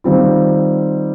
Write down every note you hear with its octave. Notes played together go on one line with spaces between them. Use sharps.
D#3 G3 C4 F4